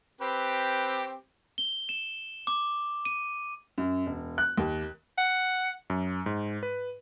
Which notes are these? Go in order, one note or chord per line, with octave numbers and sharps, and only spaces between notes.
C4 G4 B4
G7
E7
D6
D#7
F#2
E1
F#6
D#2
F#5
F#2
G#2
B4